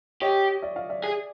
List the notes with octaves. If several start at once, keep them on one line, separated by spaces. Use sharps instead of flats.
G4 C#5 D#5
D5 E5
D#5 F5
D5 E5
G#4